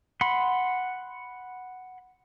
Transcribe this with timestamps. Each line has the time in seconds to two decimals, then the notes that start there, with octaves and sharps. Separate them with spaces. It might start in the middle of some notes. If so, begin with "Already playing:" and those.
0.21 F#5 B5 C6